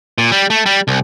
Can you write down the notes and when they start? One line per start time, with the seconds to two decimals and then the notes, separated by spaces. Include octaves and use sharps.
0.18 A#2
0.31 G3
0.50 A3
0.66 G3
0.88 C2